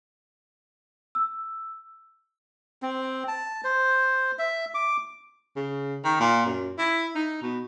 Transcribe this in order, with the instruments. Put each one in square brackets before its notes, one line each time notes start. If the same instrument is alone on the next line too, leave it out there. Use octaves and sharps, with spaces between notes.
[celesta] E6
[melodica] C4
A5
C5
E5
D6
[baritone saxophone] C#3
D#3
A#2
F#2
E4
D#4
B2